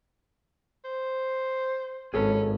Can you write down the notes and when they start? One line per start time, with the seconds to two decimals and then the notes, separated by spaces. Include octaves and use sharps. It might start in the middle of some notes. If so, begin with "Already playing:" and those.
0.85 C5
2.14 G#1 C#4 G#4 A4 B4